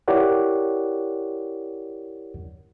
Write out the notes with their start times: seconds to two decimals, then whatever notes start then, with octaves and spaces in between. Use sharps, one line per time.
0.08 E4 G4 A#4 C#5 D5 F#5